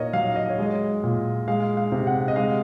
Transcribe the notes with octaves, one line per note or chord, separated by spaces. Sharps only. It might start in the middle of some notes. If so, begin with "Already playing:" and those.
Already playing: A#2 A#4 C#5 D#5
F#3 F5
D#5
C#5
G#3 D#5
A#2
G#3 F5
F5
C3
F#5
D#5
G#3 F5